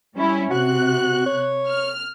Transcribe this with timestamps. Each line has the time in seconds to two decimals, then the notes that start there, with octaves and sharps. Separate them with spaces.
0.15 G3 C#4 E4
0.51 C3 F#4 F#6
1.26 C#5
1.67 F6